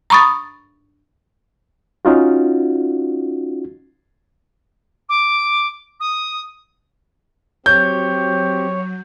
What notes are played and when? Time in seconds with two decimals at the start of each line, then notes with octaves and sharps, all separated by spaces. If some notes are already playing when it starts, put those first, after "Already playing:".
0.10 A#5 B5 C#6 D#6 A6
2.05 C#4 D#4 F4 F#4
5.09 D6
6.00 D#6
7.66 F#3 C4 G4 C#5 G6